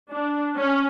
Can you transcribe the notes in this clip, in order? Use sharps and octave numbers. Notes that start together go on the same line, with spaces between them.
D4
C#4